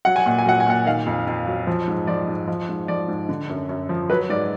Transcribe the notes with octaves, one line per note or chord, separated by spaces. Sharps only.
F#3 F#5
G#5
A#2 F#5
G#5
F#3 F#5
G#5
A#2 F#5
D#3 F5
F2
F2
F#3
F3
G#2
F3 D5
G#2
F3
G#2
F3 D5
G#2
D3
F#2
F#2
F3
F#3 B4
G#2 D5